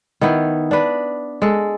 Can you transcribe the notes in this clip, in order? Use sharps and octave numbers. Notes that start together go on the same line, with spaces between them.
D#3 B3 E4
D4 B4
G#3 A4